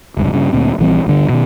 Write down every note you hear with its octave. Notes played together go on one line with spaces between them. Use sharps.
F1 C#2 G2
G2 C#3
D2 A#2 C4
A#1 E3 G3 C4
D2 G2 D3
B2 D#3